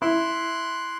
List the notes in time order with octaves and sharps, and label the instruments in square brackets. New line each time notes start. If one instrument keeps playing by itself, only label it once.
[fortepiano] E4 [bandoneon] C6 F#6